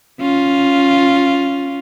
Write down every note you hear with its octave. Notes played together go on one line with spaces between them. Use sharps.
C#4 F4